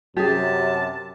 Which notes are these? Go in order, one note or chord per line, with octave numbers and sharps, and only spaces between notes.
F#2 C3 G4 G#4 A5